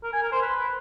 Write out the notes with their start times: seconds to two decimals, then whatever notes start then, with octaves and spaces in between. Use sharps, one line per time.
0.04 A#4
0.13 G#5
0.23 A#4
0.32 C5
0.42 B4